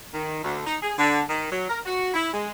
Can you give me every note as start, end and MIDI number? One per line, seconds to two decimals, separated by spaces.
0.14 0.42 51
0.43 0.65 38
0.66 0.77 63
0.83 0.93 68
0.98 1.22 50
1.28 1.47 51
1.51 1.67 54
1.69 1.79 70
1.86 2.12 66
2.14 2.31 64
2.34 2.51 56